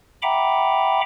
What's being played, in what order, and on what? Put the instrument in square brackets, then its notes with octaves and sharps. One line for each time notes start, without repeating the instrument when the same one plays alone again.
[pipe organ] E5 F#5 G5 A#5 B5 D6